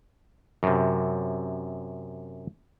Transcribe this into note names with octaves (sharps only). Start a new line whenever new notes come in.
F#2 C3